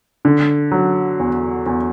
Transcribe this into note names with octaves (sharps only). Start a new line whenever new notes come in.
D3
F#3
E2
E2